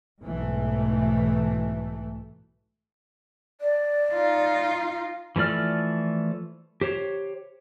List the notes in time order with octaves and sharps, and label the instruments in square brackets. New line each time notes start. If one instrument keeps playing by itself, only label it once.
[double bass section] B1 G#2 E3 A3
[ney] D5
[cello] D#4 F4
[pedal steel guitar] E3 F3 A3 D5 F6
G4 C5 C#5